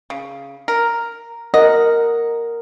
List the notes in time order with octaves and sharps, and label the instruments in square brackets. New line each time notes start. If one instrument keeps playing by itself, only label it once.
[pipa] C#3
A#4
[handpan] A#4 F#5 [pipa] D#5